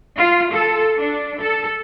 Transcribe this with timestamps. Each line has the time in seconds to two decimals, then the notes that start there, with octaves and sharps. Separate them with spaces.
0.16 F4
0.51 A4
0.98 D4
1.40 A4